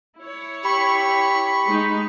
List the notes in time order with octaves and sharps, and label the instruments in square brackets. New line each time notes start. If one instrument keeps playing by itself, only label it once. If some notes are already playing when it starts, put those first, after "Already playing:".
[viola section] E4 C#5
[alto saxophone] G4 [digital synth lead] B5 [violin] C#6
[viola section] G#3 D#4